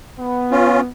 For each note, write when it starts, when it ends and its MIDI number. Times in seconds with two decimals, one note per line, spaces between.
0.19 0.88 59
0.51 0.81 61
0.51 0.81 65